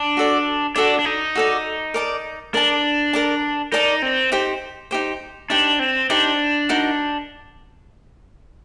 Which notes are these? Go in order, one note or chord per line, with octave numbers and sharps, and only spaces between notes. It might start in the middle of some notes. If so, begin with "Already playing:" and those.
Already playing: D4
F#4 A4 D5
D4 F#4 A4 D5
D4
D#4
F#4 A4 D5
A#4 D5 A5
D4 A#4 D5 A5
A#4 D5 A5
D#4 A#4 D5 A5
C4
D#4 G4 C5
D#4 G4 C5
D4 D#4 G4 C5
C4
D4 D#4 G4 C5
D#4 F#4 A#4